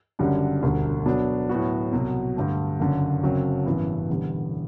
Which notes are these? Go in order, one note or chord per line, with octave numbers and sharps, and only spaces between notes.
F#1 F#2 D3 G3 D4
E1 D2 D3 G3
B2 F#3 B3 D4
A2 F#3 B3 F#4
C2 B2 F#3
G2 D3 A3
F#1 F#2 D3
F#1 F#2 F#3 C4
A1 G2 E3 B3
E1 E2 D3 G3 B3